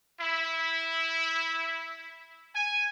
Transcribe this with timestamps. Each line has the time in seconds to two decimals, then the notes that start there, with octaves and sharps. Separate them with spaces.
0.20 E4
2.54 G#5